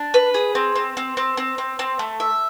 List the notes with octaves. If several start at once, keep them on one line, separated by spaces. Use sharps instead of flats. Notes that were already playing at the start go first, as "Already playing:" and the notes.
Already playing: D4
B4
G#4
C4
C4
C4
C4
C4
C4
C4
A3
E5